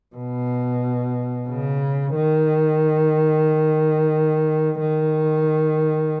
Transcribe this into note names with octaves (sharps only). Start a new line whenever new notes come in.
B2
C#3
D#3
D#3